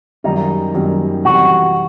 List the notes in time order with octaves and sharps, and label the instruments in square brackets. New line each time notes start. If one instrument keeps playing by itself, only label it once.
[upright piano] F#2 D#3 G3 [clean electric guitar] D#4
[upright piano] F#2 D#3 G3
[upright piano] C3 E3 G3 [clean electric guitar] F#4